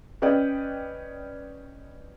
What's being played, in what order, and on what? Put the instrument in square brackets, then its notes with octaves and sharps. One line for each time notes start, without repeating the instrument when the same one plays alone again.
[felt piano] C#4 B4 D5 D#5 G5